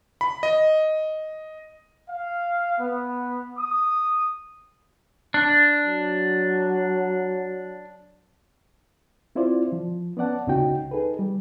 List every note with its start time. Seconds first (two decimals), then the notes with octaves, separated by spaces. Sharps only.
0.21 B5
0.43 D#5
2.10 F5
2.79 B3
3.58 D#6
5.34 D4
5.83 F#3
9.35 C4 E4 F4 C5 D5
9.72 F3
10.17 B3 C#4 D5 F#5 A5
10.47 C#2 C#3 C#4 D#4 F#4 G5
10.91 D#4 G#4 A4 B4
11.19 G3